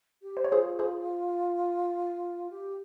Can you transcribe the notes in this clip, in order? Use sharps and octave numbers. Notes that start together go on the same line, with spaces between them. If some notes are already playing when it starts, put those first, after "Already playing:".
G4
C5
C#5
F4 G#4 C5
G#4 C5
G4